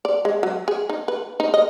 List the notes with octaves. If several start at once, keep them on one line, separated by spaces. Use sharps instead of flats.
D5
G#3
F#3
G#4
D#4
B4
D#4
D#5